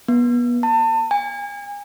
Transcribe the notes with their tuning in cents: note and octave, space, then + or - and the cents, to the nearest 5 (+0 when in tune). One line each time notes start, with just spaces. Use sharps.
B3 -30
A5 +35
G#5 -35